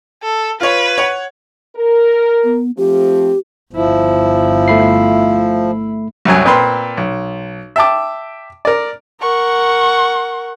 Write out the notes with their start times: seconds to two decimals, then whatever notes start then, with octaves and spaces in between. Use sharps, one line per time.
0.23 A4
0.61 F4 B4 C#5
0.98 C#5 F#5
1.76 A#4
2.44 B3
2.77 F3 A3 C4 G4
3.73 G1 F3 E4
4.68 A3 B5 C7
6.25 C2 F#2 F#3 G#5
6.45 A#2 C4 B4 C6
6.97 B1
7.76 E5 G5 A5 D6
8.65 A#4 D5
9.21 A#4 F#5 C#6